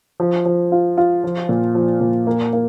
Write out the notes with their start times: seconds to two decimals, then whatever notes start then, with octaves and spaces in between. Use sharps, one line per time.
0.20 F3
0.45 F3
0.72 F4
0.98 F4
1.24 F3
1.49 A#2
1.75 F3
2.01 A#2
2.27 A#3
2.53 A#3